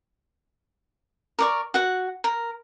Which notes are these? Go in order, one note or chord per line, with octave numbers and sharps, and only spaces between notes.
A#4 D5 C#6
F#4 F#5
A#4